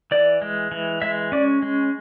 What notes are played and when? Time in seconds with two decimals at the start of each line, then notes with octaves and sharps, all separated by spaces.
0.11 E3 D5
0.42 G#3
0.72 E3
1.02 G#3 E5
1.32 C#4 D5
1.62 G#3